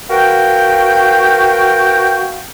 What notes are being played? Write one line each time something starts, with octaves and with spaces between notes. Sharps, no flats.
F#4 A#4 B4 F5 G5